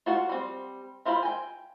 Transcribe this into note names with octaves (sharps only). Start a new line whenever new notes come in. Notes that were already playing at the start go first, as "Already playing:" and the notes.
F4 F#4 F#5
G3 C4
E4 F4 C5 E5 B5
G5 G#5